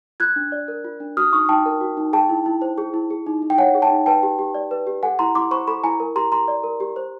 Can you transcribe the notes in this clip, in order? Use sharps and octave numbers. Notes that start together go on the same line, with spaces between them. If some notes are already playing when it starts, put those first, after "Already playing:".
F4 F#6 G#6
D4
D5
A#4
F4
D4
F#4 D#6 F6
D#4 C#6 D#6
D#4 G5 A5
A#4
F#4
D#4
G#4 G5 A5
E4
E4
C5
G#4
E4
G#4
D#4
D#4
G5
C#5 F#5 G#5
G#4
G5 A5
D#4
B4 G5 A5
G4
G4
D5
B4
G4
A4 F#5 G#5
E4 A#5 C6
E4 C6 D6
C5 B5 C#6
A4 B5 C#6
E4 G#5 A#5
A#4
G4 A#5 C6
G4 A#5 C6
D5
A#4
G4
C5